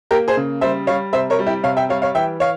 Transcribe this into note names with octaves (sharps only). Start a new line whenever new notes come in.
A#3 G4 A#4
G#4 C5
C#3
G3 C5 E5
G3 C#5 F5
C3 C5 E5
A#4 C#5
G3
E4 G4
C3 C#5 F5
E5 G5
G3 C#5 F5
C#5 F5
E3 E5 G5
C#5 F5